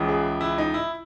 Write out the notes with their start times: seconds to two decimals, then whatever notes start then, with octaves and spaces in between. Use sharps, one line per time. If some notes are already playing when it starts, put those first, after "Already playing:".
Already playing: C#2 C#3 E3
0.08 G#4
0.41 E4
0.58 D#4
0.74 E4